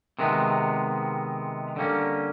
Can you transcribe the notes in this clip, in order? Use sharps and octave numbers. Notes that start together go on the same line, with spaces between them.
C3 D#3 G#3 B3
D3 G3 A#3 C#4